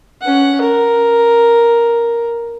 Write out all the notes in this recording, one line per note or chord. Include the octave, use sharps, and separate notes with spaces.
C#4 F#5
A#4